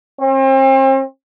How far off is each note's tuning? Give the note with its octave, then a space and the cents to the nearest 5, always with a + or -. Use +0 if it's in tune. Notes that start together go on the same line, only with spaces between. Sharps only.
C4 +40